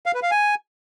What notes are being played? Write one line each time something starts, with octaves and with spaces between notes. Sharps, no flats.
F5
B4
F5
G#5